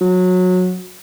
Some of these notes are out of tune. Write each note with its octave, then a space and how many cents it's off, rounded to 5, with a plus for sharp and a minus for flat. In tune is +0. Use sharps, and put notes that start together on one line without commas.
F#3 -20